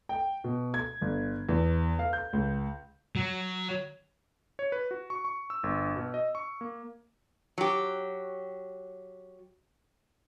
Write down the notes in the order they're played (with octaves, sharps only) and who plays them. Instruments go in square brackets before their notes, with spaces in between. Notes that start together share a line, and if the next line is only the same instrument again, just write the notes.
[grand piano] G5
B2
G#6
G1
E2
F5
G6
C#2
[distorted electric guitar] F#3
[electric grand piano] C#5
B4
F#4
C#6
C#6
E6
G1
B2
D#5
C#6
A#3
[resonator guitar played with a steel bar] F#3 G4